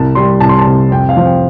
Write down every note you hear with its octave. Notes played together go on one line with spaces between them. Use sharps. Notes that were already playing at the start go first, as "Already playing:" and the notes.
Already playing: C2 A5
G3 C6
C2 A5
C6
A5
C3
F2 G5
F5
F3
G5